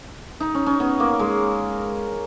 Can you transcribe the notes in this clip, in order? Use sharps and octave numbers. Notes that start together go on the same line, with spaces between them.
D#4
C#4
C#4
B3
A#3
G#3